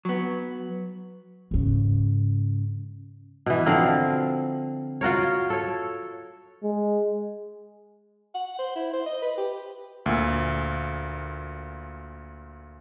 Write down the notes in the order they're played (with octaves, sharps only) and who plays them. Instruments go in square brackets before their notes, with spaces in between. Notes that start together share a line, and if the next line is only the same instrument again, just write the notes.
[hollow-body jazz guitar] F#3 B3
[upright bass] G#2 C#3
[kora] B2 E3
D3 F3 C4 A#4
F4 F#4 A#4 C#5
A4 C#5
[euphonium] G#3
[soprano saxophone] F#5
C5
E4
C5
D#5
B4
G4
[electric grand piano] D2 A#2